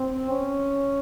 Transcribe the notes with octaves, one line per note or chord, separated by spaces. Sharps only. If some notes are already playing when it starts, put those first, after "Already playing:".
Already playing: C4
C#4